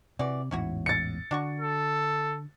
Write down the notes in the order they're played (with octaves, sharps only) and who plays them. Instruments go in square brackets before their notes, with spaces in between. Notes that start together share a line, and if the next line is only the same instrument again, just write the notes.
[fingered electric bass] C3 [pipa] E3 F#4 D5
[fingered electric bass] A1 E2 G#2 [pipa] C#4 E4 F#4
[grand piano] A6 C#7
[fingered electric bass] D3 [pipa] D4 F#4 C#6
[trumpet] A4